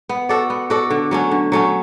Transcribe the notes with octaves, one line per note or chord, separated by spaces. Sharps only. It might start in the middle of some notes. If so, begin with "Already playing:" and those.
B3
F#4 A4 D5
B3
F#4 A4 D5
D3
F#3 A3 C#4
D3
F#3 A3 C#4